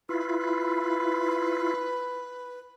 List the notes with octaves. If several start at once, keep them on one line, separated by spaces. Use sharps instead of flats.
E4 F4 B4